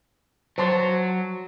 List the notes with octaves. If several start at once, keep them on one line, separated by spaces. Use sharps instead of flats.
F#3 C5 A5 C6